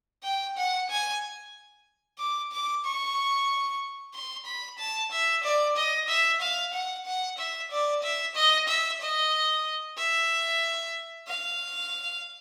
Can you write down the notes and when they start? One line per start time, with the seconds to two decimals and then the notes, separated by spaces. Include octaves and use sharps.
0.24 G5
0.57 F#5
0.90 G#5
2.18 D6
2.52 D6
2.84 C#6
4.14 C6
4.46 B5
4.79 A5
5.12 E5
5.44 D5
5.76 D#5
6.08 E5
6.41 F5
6.74 F#5
7.06 F#5
7.38 E5
7.71 D5
8.02 E5
8.35 D#5
8.68 E5
9.01 D#5
9.98 E5
11.27 F5